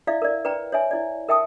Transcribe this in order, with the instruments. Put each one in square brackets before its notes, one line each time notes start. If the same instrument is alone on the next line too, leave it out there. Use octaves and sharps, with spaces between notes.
[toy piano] E4 D5 E5 F5
A#4 D5
B4 D5 G5 A#5
C#5 E5 G#5
E4 D5
A#4 E5 G5 A5 D#6